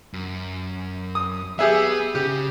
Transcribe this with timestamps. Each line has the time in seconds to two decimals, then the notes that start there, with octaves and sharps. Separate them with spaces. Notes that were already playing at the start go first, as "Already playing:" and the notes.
0.14 F#2
1.15 D#6
1.59 B3 G4 G#4 E5
2.15 C#3 G4